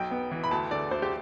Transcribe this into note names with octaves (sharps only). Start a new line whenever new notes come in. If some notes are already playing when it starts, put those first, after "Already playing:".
Already playing: B1 G5
B3
E3
B5
D2 A5
D3 D5
D2 C5
G4